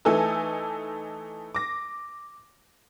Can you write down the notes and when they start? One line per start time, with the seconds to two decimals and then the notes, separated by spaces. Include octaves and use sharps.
0.05 E3 A3 D#4 A4 G#5 E6
1.55 D6 A#6